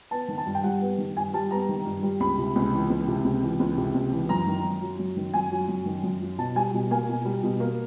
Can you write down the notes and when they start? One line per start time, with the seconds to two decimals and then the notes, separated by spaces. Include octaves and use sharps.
0.11 B3 A5
0.28 D#3
0.38 A5
0.46 G2
0.55 G5
0.63 G3 F#5
0.82 B3
0.98 D#3
1.16 G2 G#5
1.34 G3 A5
1.51 B3 A#5
1.69 D#3
1.85 G2
2.03 G3
2.20 C#2 B5
2.38 C3
2.55 C#2
2.73 E3
2.90 C#2
3.08 C3
3.24 C#2
3.42 E3
3.59 C#2
3.77 C3
3.94 C#2
4.12 E3
4.29 F#2 A#5
4.47 D#3
4.64 F#2
4.82 F#3
4.99 F#2
5.17 D#3
5.34 F#2 G#5
5.51 F#3
5.68 F#2
5.86 D#3
6.03 F#2
6.21 F#3
6.38 B2 A5
6.55 G3 G#5
6.74 B2
6.91 A#3 G#5
7.08 B2
7.25 G3
7.43 B2
7.60 A#3